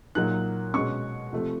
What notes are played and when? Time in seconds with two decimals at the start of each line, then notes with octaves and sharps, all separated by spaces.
0.15 A#2 F#3 A#3 D#4 F#6
0.74 B2 G#3 C#4 C#6
1.32 C3 F3 A3